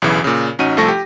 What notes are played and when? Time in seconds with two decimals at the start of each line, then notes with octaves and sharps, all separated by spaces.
0.02 B1 E2 C#3 E3
0.24 A#2 C#3
0.59 A1 C#4 D#4 F#4 D#7
0.77 C2 F3 A3 A4 C#6 A#6
0.88 G4